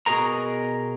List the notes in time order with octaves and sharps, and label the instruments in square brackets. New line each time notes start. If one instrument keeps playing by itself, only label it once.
[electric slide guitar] B2 F#4 G#4 A#4 A#5